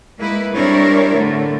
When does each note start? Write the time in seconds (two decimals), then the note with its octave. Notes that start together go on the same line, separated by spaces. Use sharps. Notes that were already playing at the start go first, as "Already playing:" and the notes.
0.18 G#3 A#3 E4 B4
0.53 G3 C4 D4 E4 A#4 C#5
1.13 A2 D3 A3